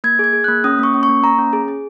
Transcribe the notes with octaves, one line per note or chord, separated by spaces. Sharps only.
A#3 G#6
G#4 G#6
G#4
F#6
A#3
C#4 D#6
A#3 C#6
C#4
C#6
A#3
A#3 A#5
C#4
G#4
G#4